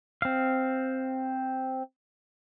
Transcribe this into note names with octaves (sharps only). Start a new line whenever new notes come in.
C4 F5